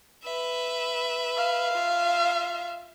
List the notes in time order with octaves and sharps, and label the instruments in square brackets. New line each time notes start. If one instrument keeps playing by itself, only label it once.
[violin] B4 E5
[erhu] F5
[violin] F4 E5